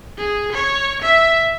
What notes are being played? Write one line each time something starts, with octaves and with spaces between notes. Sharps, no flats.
G#4
C#5
E5